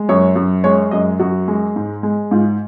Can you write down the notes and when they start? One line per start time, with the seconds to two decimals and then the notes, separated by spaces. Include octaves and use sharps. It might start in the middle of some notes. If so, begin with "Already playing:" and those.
Already playing: G#3
0.09 F#2 C#5
0.36 F#2
0.64 G#3 C#5
0.91 F#2 D#5
1.19 F#2 F#4
1.48 G#3
1.76 G#2
2.03 G#3
2.31 G#2 F4